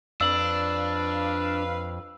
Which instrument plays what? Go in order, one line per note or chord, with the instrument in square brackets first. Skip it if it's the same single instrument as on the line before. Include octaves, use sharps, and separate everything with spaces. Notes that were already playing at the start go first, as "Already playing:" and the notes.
[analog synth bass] F2 [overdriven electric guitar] D4 [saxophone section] B4 F5 [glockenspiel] E6 F#7